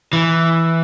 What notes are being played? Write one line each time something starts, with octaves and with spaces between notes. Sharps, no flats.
E3